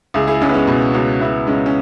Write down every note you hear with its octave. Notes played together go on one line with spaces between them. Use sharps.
C#2 E4 G#4
E4 G#4
C#2 G#3 C#4
B3
G#3 C#4
B2
C#2 C#4 F#4
C#3 B3 E4
C#3 G#3 C#4
C#4